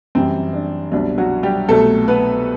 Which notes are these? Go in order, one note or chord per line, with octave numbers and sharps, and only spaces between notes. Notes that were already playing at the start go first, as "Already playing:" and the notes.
F#2 E3 G3 C4
D4
C2 B2 F#3 D4
F#3 F#4
G3 G4
C2 B2 F#3 A3 A4
B3 B4